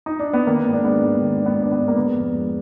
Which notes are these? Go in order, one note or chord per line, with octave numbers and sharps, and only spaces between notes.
D#4
D4
B3
D#3 A#3
G#2
D4
G#3 B3
G#2
D#3
G#2 D4
B3
G#3 D4
B3
G#2
A#3
D3 B3
F2
G#3